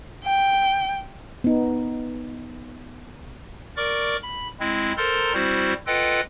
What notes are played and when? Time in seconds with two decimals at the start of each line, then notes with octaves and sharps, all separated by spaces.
0.24 G5
1.44 B3 D#4
3.77 A#4 D5 C#6 D6
4.23 B5
4.60 G#3 C4 E4
4.97 A4 A#4 C5 A#5 C6 A6
5.34 G3 C4 E4 F#4 C5
5.87 F4 A4 B4 D#5 F#5 G5